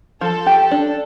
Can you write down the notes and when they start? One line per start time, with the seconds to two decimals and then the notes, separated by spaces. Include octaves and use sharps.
0.21 F3 A4
0.46 G4
0.71 D4